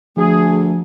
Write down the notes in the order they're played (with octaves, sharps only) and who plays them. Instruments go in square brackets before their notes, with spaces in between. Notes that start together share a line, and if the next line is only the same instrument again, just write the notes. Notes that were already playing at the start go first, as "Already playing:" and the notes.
[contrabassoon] D2 [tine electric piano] F3 [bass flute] A3 [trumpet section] G#4